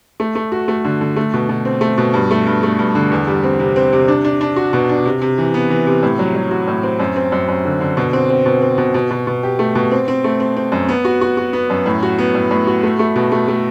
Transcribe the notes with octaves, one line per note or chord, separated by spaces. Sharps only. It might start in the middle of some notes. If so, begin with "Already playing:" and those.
A3
A3
F#4
A3
D3
D3
A3
B2
B2
C4
A3
B2
G2
A3
G2
A3
G2
D3
E2
G3
C4
C3
C4
C3
D4
D4
D4
F#4
B2
D4
C3
C3
E3
B3
E3
C3
A2
F#3
F#3
F#4
A2
C4
F#2
C4
F#2
F#2
D3
D3
B2
C4
C4
B2
C4
B2
B2
B2
B2
G4
A3
B2
C4
C4
A3
C4
C4
F#2
B3
F#4
F#4
F#4
B3
F#2
A2
F#4
B3
A2
A2
F#4
A3
A3
B2
A3
A3